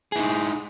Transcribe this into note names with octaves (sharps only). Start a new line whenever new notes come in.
D#4 E4 G#4